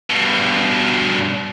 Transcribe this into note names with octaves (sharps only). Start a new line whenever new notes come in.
G2 B2